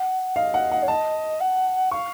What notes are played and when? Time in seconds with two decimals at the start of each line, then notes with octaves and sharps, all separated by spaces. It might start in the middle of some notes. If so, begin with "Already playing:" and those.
Already playing: F#5
0.36 D#5 F5
0.54 F#5
0.72 F#5
0.83 C#5
0.88 D#5 A5
1.40 F#5
1.91 F5 C#6